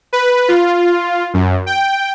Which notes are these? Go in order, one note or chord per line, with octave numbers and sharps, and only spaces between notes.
B4
F4
F#2
G5